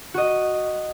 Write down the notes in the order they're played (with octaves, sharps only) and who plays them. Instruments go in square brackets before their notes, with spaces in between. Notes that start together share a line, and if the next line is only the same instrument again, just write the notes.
[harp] F#4 D#5